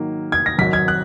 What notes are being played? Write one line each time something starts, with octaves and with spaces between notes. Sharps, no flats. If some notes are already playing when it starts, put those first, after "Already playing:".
Already playing: G#2 D#3 F#3 A#3
G#6
A#6
G#1 G#2 F#3 B6
G#6
F#6